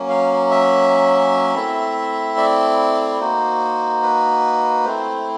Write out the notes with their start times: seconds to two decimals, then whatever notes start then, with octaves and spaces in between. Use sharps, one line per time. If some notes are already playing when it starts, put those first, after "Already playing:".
Already playing: F#3 A#3 C#4
0.09 F5
0.51 E5
1.54 A3 C4 E4
2.37 D5
3.20 A#3 D#4 F#4 C5
4.03 B4
4.85 A3 C4 E4 C5